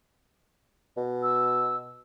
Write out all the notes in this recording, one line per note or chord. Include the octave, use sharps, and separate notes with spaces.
B2
E6